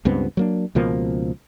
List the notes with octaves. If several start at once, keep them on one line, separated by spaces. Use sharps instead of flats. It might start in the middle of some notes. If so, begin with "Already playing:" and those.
C#2 G2 B3 C4
F#3 A#3 D4
C#2 B2 F3 A#3